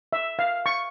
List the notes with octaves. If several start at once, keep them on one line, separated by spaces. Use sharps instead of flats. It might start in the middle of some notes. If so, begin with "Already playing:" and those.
E5
F5
C#6